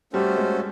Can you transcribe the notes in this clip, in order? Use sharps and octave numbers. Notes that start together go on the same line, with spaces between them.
G3 A3 C#4 F#4 A4 C5
G#3